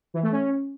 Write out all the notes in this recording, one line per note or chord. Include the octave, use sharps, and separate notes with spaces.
E3
A3
C#4